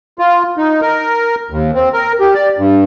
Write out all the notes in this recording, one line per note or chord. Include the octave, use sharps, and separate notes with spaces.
F4
D#4
A#4
D#2
C4
A#4
G4
D5
G2